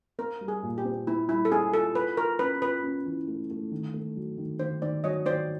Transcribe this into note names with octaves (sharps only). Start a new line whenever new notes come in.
C4 A#4
G3
G#4
A#2
G4
C4
C4 E4
G3 E4
A4
C4 G#4
F4 A4
F4 B4
F4 A#4
C#4 B4
F4 B4
C#4
E3
A3
A3
D#3
A3
F#3
D#3
D#3 C5
D#3 C5 D5
F#3 C#5 D#5
D#3 C5 D5